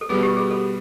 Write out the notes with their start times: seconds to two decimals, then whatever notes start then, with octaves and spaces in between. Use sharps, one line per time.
0.01 A4
0.09 B2 G3 B3 G#4
0.23 G4
0.37 G#4
0.51 A4